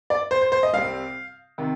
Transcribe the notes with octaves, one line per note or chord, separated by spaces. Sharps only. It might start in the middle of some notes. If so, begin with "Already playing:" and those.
D5
C5
C5
C5
D#5
C2 C3 G3 C4 F5
C3 D#3